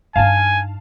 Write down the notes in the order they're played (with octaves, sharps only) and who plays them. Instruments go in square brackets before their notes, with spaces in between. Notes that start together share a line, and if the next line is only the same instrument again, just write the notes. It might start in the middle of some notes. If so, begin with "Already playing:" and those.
[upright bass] G2 D#4 [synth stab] F5 A5 [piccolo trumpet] G#5